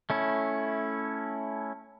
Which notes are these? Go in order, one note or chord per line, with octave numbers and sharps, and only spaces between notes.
A3 C#4 E4